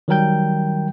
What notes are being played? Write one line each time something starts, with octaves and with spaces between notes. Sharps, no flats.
D#3 F#3 G3 A#4 G5 G6